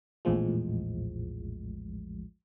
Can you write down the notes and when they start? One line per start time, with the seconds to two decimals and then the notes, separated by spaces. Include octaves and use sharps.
0.25 A#1 E2 A2 F3 G#3